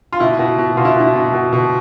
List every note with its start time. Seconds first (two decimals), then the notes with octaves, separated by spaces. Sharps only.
0.12 F4
0.20 B2 E4
0.39 B2
0.58 B2
0.77 B2 F4
0.85 E4
0.96 B2 E4
1.15 B2
1.34 B2
1.53 B2